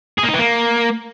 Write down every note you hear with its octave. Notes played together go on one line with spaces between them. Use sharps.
G#4
A#3
D#4
E3
A#3